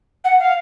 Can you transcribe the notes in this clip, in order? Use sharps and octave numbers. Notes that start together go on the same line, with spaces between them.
F#5
F5